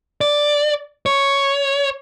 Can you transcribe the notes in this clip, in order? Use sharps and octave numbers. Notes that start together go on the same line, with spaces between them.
D5
C#5